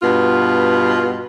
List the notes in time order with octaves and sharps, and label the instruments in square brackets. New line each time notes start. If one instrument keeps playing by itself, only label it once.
[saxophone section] G2 B2 B3 F4